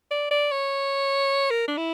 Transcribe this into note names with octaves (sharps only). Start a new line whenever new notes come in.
D5
D5
C#5
A#4
D4
E4